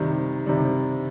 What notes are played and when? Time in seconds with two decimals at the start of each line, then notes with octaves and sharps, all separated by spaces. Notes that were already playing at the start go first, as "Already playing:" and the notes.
Already playing: C3 D#3 G3
0.46 C3 D#3 G3